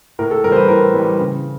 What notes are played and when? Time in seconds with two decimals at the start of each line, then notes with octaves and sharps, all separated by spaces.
0.19 A2 A#4
0.31 A4
0.44 G3 A#4
0.48 E3 C5
0.56 B4
0.68 A2 A#4
0.94 E3 G3
1.19 C#3